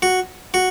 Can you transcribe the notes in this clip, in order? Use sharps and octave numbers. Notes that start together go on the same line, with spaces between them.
F#4
F#4